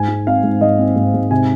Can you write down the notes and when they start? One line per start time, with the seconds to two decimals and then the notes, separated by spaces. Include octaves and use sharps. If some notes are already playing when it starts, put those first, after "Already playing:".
Already playing: G#2 G#5
0.08 G#3
0.27 C4 F5
0.44 G#2
0.61 G#2 D#5
0.79 C4
0.96 G#2
1.14 G#2
1.31 C3 G#5